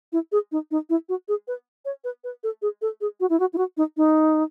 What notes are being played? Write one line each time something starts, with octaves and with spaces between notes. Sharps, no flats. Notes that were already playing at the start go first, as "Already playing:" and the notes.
E4
G#4
D#4
D#4
E4
F#4
G#4
B4
C#5
B4
B4
A4
G#4
A4
G#4
F#4
E4
F#4
E4
F#4
D#4
D#4